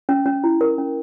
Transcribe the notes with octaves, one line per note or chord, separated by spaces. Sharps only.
C#4
C#4
E4
A#4
C#4